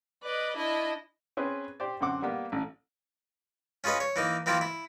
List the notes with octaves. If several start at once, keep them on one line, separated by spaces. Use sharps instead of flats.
B4 D5 D#5
D4 E4 D#5
C4 C#4 G#4 B4
G4 C5 D5
F#2 D3 C4 F#5 D6
G3 A#3 B3
A1
C#4 F4 G#4 B4 D#5
C#5
E3 A#3 D#4
E3 A#3 C4 E4 F4
E4